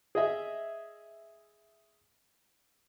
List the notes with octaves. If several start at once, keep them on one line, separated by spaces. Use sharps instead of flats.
G#4 D#5 E5